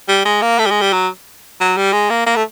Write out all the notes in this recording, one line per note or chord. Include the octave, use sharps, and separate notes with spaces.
G3
G#3
A#3
A3
G3
G#3
G3
F#3
F#3
G3
G#3
A#3
A#3
A3